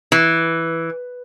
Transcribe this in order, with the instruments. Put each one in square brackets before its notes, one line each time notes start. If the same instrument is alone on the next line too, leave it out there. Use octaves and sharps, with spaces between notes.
[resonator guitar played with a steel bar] E3